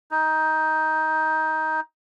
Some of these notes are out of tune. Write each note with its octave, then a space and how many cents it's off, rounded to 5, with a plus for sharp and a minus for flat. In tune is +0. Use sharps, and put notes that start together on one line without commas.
D#4 +15